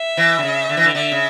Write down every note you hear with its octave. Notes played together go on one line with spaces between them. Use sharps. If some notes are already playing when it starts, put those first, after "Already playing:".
Already playing: E5
E3
D3
C#3
D3
E3
D3
D3 E5
C#3